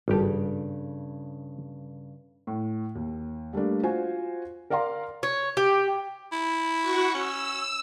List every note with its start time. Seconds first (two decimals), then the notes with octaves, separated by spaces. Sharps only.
0.08 G#1 G2 C#3 G4 A4
2.47 A2
2.95 D#2
3.53 G3 A3 A#3 D4
3.83 F4 F#4 C5 G#5
4.70 A#4 D5 F5 A#5 C6
5.23 C#5
5.57 G4
6.32 E4
6.79 F#4 F#5 C#6
7.14 C#4 E6